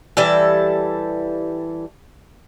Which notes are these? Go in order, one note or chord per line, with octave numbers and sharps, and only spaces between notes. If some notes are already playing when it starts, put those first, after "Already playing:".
E3 G3 A4